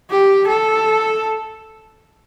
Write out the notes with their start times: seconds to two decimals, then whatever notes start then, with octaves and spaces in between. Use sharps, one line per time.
0.10 G4
0.47 A4